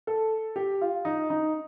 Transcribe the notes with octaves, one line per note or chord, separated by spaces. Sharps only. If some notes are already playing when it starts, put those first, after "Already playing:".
A4
G4
F4
D#4
D#4